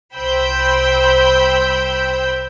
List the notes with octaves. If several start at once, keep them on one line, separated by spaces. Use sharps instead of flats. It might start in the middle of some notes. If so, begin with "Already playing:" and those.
C2 C5 G5 B5 E6 G6